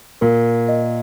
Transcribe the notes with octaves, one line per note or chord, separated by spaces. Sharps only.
A#2 A#4
D#5